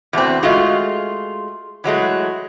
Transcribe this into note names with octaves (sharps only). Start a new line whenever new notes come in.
E2 B2 A3 C4
G#3 A3 F4 F#4 G#4
E3 F#3 G#3 A3